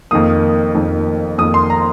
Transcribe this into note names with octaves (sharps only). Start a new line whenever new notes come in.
F2 D#3 A#3 D#6
F2 D#3 A#3
F2 D#3 A#3 D#6
C6
A#5